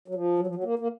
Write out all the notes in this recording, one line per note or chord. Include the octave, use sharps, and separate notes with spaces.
F#3
F3
F#3
F3
F#3
A#3
A#3